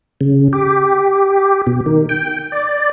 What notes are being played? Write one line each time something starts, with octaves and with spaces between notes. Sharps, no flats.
C#3
G4
B2
D#3
G5
D5